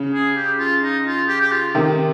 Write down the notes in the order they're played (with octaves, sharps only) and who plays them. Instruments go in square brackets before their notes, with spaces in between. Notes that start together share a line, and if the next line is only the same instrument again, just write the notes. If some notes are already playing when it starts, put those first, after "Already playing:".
Already playing: [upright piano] C#3
[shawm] G#4
G4
F4
D#4
F4
G4
G4
F4
[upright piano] C3 D#3